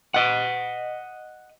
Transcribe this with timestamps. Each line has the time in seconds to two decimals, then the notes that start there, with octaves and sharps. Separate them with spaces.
0.14 D#5 F#5